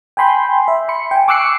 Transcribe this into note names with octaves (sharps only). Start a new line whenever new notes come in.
G5 G#5 B5 C6 G6
E5
B5 C6 C#7
G5 G#5
C#6 D6 E6 F#6 C7 C#7